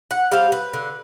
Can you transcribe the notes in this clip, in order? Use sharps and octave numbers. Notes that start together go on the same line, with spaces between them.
F#5
G3 C4 F5
B4
D3